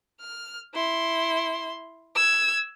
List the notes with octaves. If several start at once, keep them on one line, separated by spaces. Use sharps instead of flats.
F6
E4 C6
E6 G#6